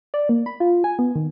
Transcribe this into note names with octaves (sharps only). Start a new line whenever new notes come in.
D5
A#3
B5
F4
G#5
B3
D#3